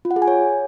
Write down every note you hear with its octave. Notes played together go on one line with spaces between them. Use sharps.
F4
F#5
G#4
G#5
C#5